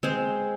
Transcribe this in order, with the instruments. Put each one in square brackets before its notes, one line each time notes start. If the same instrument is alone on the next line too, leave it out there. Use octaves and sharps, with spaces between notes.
[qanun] G#3 C4 G#4 C5